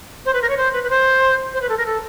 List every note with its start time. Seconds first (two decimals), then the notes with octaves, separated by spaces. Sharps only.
0.25 C5
0.33 B4
0.42 A#4
0.49 C#5
0.57 C5
0.73 B4
0.83 B4
0.89 C5
1.54 C5
1.61 B4
1.69 A4
1.77 A#4
1.85 A4